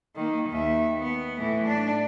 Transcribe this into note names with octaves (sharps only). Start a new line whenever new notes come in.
D#3 A#3
D#2 E5
B3
A2 E3
D4